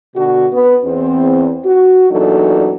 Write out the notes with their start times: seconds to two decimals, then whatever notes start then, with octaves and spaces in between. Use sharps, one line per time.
0.16 B2 D3 F#4
0.52 B3
0.85 E2 C4
1.65 F#4
2.11 E2 A#2 F#3 D4 D#4 A4